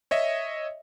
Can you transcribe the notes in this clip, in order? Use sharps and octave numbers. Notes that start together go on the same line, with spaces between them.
C#5 D#5 E5